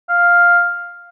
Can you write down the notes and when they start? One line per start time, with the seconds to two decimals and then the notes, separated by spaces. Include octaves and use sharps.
0.09 F5